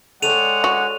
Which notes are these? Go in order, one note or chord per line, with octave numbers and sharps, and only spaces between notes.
G#3 A4 C#5 D5 F#5 G5 D#7 F7
F#4